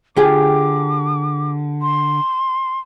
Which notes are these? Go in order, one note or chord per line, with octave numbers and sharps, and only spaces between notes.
D3 F4 G4 G#4 D6
C6